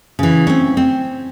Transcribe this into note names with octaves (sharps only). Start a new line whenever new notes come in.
C#3 E3
C4 C#4
C4